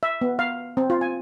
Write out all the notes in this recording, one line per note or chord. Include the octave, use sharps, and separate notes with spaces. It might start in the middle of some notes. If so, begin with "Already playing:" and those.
E5
B3
F5
C4
F4
G#5